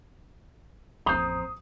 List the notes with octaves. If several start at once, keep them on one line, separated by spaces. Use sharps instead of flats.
A1 F2 C5 A#5 D#6